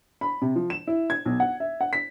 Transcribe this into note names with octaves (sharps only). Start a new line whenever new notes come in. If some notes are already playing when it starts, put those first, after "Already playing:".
B5
C3
F3
E7
E4
G#6
B1
F#5
E5
F#5
B6